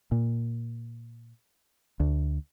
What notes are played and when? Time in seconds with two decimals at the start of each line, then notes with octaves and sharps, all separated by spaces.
0.12 A#2
2.00 D2